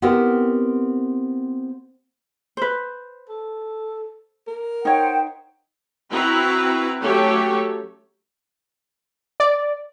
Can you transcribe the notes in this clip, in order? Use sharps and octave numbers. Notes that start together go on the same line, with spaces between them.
B3 C4 E4 G4 A#4 B4
B4 C5
A4
A#4
D#4 C5 C#5 F#5 G5
C4 E4 F#4 B4 A#5
F#3 A3 C#4 G4 A4 C#5
D5